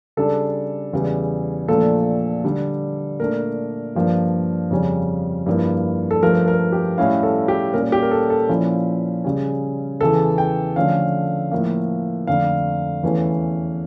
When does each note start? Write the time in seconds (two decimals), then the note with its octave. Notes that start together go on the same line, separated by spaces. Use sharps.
0.17 C#3 G3 D4 A4
0.93 E2 C#3 G3
1.68 A#2 F3 A3 D4 A4
2.44 D3 G3 D4
3.20 A#2 A3 D4 A#4
3.95 G2 F3 A#3 D4
4.71 F2 C#3 G3 C#4
5.46 G2 F3 A#3 E4
6.11 A4
6.22 G2 F3 A3 A#4
6.48 A#4
6.72 G4
6.98 A2 G3 C#4 E4 F5
7.23 A4
7.48 G4
7.73 A#2 G3 C#4 A#4
7.92 G4
8.02 A#4
8.11 A4
8.30 A4
8.49 A#2 F3 C#4 E4
9.24 C#3 G3 C#4
10.01 E2 C#3 E3 A4
10.38 G5
10.76 D3 F3 A3 C#4 F5
11.52 A2 F3 A#3
12.27 F2 D3 A3 D4 F5
13.03 E2 E3 A3 C#4